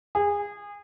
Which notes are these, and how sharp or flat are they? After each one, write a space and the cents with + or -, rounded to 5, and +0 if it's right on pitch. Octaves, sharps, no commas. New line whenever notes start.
G#4 -25